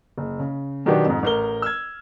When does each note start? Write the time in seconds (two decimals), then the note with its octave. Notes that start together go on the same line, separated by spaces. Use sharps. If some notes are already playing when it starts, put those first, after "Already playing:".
0.18 F#1
0.39 C#3
0.86 B2 D#3 F#3 B3 D4 G4
1.06 F2 G#2
1.23 A1 A#4 G7
1.62 E6 F6 G#6